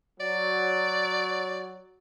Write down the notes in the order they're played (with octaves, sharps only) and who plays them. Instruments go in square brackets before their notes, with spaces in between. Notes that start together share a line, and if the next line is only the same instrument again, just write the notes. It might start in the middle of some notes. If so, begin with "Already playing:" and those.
[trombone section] F#3 [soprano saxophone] D5